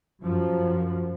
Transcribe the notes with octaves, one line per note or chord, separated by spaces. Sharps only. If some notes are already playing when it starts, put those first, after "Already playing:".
F#2 F3